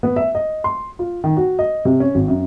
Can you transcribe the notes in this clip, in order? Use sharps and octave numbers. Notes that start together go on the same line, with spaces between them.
B3
E5
D#5
C6
F4
D#3
F#4
D#5
C3
C#4
G#1
F#2